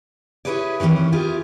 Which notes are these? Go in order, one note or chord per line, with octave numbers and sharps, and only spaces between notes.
E4 G4 G#4 B4 C#5 D5
D#3 E3 G3 C4 C#4
E4 F4 G4 G#4